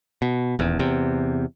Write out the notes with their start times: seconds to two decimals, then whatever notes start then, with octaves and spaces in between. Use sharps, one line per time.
0.22 B2
0.59 D#1 E2
0.79 E2 C3